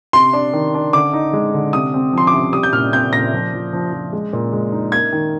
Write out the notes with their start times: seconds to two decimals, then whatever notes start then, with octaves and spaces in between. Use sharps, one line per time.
0.13 C3 C6
0.33 D4
0.53 D#3
0.74 D4
0.93 D3 D6
1.13 D#4
1.33 G#3
1.54 D3
1.73 C3 D#6
1.94 C4
2.13 F3 C6
2.27 D6
2.34 C3
2.53 G3 D#6
2.63 G6
2.73 A#2 F6
2.93 C4 G6
3.13 A#2 A#6
3.33 F3
3.54 F3
3.73 F3
3.93 F3
4.13 G#3
4.33 A#2
4.53 G#3
4.72 D#4
4.92 A#3 G#6
5.13 D#3